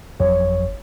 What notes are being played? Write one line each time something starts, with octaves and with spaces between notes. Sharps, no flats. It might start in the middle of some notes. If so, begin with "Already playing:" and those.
G1 F2 F#3 C#5